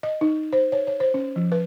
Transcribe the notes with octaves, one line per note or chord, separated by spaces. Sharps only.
D#5
D#4
C5
C#5
C#5
C5
C#4
F3
B4